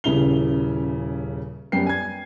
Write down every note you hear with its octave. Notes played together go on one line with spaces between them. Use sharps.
D#1 C#3 E4 F7 G7
F#2 G3 B3 G5 C7
G#5 G#6